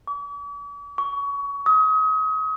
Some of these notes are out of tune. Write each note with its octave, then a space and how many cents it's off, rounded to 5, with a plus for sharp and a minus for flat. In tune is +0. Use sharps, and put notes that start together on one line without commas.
D6 -45
C#6 +25
D#6 +35